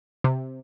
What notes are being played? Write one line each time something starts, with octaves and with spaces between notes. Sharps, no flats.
C3